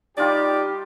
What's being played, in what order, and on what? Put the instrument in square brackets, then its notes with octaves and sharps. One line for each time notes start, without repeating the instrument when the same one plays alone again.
[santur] G3 F4 D#5 [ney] D#4 [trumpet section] G4 [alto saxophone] D5